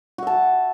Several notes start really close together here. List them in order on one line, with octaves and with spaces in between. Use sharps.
F#4 E5 A5